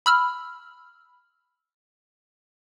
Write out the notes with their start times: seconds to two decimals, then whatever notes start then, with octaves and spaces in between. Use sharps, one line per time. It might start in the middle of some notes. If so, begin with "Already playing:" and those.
0.06 B5 E6 F6